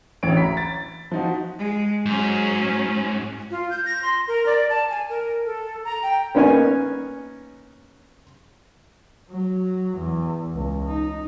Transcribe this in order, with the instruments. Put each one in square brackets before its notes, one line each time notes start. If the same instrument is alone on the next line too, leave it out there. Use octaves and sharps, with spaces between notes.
[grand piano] D1 A1 D2 C#5 D7
A#5 B5 B6
A6
F3 D#4 F#4
[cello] G#3
[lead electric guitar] G#2 [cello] F#3 C#4
[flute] F4
G6
A#6
C6
A#4
D5
A5
G#5
A#4
A4
A#5
G5
[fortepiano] A#3 B3 C#4 D#4 C#5 G#5
[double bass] F#3
E2
C#2
D#4